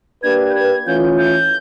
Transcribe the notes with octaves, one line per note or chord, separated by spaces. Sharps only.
A#3 D4 G4 B4 G#6
G6
G#6
E3 A3 C#4 F4 G6
G6